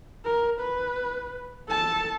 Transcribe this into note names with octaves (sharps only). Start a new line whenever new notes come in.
A#4
B4
A4 A5